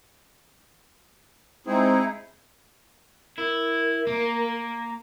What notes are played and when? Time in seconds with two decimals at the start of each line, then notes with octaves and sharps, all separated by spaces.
1.67 G#3 C4 D#4 E4 G#4
3.38 E4 A#4
4.07 A#3